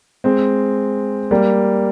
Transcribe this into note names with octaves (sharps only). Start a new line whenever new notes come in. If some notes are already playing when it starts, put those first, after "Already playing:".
G#3 C4
G3 A#3